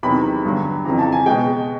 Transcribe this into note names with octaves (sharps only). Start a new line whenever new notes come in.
E2 C3 D#3 F#3 B5
G2 D3 F#3
F2 C#3 E3 A#5
A5
G#5
B2 G#3 G5